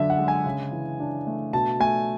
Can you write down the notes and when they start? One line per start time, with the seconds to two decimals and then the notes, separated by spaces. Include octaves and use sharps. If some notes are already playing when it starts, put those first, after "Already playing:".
Already playing: F#2 D3 D4 E5
0.10 F#5
0.19 G#3
0.28 G#5
0.46 C#3
0.72 E3
1.00 D4
1.27 A3
1.53 B2 A5
1.80 A3 G#5